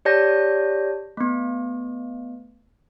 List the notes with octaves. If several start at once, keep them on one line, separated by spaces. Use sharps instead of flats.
G4 C#5 D5 A5 G6 A#6
A3 B3